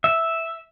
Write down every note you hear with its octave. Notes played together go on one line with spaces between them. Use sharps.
E5